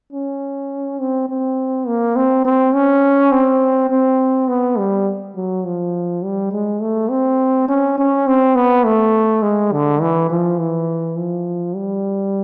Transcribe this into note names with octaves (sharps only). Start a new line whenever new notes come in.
C#4
C4
C4
A#3
C4
C4
C#4
C4
C4
B3
G3
F#3
F3
G3
G#3
A3
C4
C#4
C#4
C4
B3
A3
G#3
D3
E3
F3
E3
F3
G3